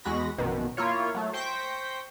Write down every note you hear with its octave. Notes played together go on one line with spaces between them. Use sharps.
E2 G#3 F#4 B5 A#6
A#1 F#2 B2 D#3
A#3 E4 F4 C#5
F#3 A3
C5 G5 C#6 G6 A#6 B6